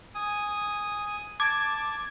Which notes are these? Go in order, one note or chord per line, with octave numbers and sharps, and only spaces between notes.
G#5 D#6
A5 D6 G#6